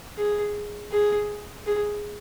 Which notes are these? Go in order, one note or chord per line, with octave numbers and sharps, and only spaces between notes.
G#4
G#4
G#4